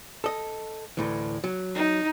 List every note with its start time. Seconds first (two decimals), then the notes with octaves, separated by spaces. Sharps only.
0.24 A4 D#5
0.97 D2 A2 E3
1.44 F#3
1.75 D#4